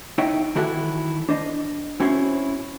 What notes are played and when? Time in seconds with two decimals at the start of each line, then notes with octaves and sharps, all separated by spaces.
0.18 D#4 E4 C#5 D#5 E5 G5
0.55 D#3 E3 E4 F#4 G4 A4
1.29 D4 C5 D#5
2.00 C4 C#4 E4 F#4 C5 C#5